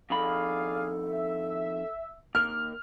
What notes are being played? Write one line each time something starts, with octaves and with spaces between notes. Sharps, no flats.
F2 D#3 G#4 A4 D5 F5 B5
E5
D#2 A#4 F6